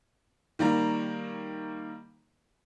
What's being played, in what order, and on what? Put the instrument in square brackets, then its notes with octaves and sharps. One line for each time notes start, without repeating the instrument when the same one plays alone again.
[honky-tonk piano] D#3 G3 A#3 A#5